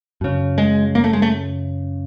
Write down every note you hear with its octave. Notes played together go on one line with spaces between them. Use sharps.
F#2 C#3
G#3
A#3
A3
G#3
A3